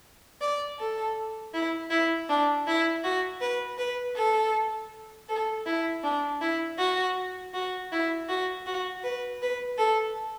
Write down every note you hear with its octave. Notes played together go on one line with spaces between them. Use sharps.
D5
A4
E4
E4
D4
E4
F#4
B4
B4
A4
A4
E4
D4
E4
F#4
F#4
E4
F#4
F#4
B4
B4
A4